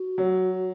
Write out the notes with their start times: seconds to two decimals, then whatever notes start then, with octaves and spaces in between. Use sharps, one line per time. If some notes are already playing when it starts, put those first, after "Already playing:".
Already playing: F#4
0.18 F#3